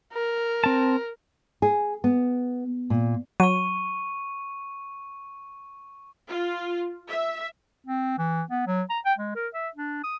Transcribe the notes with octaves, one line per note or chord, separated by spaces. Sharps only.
A#4
C4 A5
G#4
B3
A#2
F#3 C#6 D#7
F4
E5
C4
E3
B3
F#3
A#5
G5
G#3
A#4
E5
D4
D#6